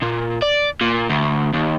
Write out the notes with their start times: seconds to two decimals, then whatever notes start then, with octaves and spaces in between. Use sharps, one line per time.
0.02 A#2
0.42 D5
0.81 A#2
1.10 D2
1.54 D#2